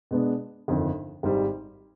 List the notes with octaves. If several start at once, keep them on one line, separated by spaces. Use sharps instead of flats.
B2 G#3 B3 D4
G1 F2 D#3
G#1 G#2 G3